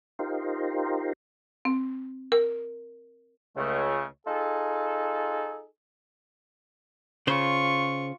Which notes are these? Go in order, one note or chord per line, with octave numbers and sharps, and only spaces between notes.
D#4 F4 G4 A#4 C5
C4
A#4
C#2 C#3 A3
D#4 F4 G#4 A4
C#3 F4 C5 C#6